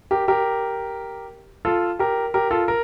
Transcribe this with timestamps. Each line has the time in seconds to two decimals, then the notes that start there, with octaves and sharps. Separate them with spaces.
0.11 G4 A#4
0.28 G4 A#4
1.65 F4 A4
1.99 G4 A#4
2.34 G4 A#4
2.51 F4 A4
2.68 A#4